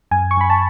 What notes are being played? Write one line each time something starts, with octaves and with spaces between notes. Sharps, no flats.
F#2 G#5
C#6
F#2 B5
A5